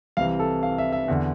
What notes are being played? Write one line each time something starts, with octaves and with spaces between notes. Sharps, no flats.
C2 C3 E3 F5
A4
F5
E5
E5
E2 D3